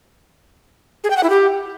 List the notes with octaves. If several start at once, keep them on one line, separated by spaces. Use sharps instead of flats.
G#4
G5
F#5
E4
G4